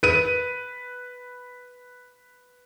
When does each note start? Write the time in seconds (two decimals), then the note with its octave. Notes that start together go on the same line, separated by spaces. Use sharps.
0.03 B4 D#7